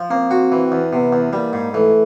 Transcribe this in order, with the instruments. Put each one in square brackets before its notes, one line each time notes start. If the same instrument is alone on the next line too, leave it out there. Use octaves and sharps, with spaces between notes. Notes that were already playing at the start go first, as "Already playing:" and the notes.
Already playing: [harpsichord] F3
[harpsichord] A#3 [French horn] C4
[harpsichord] F#4
E3
E2
[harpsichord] C3 [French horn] B3
[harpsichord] E2
[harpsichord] G3 [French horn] A#3
[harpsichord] G#2
[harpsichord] E3 [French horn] A3